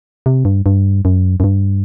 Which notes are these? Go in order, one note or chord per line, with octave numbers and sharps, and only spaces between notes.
C3
G2
G2
F#2
F#2
G2